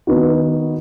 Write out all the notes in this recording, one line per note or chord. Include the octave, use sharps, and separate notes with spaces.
D#3 B3 D#4 F#4